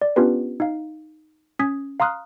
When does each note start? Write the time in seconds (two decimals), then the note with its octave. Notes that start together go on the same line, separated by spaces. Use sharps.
0.02 D5
0.16 B3 C#4 D4 F4 G4 B4
0.60 D#4 F5
1.59 C#4 D#6 G#6 B6
2.00 F5 A#5 C6 D#6 F6 F#6